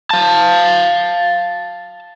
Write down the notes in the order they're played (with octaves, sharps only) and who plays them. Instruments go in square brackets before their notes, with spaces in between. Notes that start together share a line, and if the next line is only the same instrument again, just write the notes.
[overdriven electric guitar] F5 A5